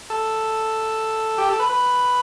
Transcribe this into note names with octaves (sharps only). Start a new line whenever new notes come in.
A4
G4
A4
B4
B4